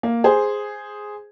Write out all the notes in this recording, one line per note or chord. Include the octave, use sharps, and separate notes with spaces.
A#3
G#4 C5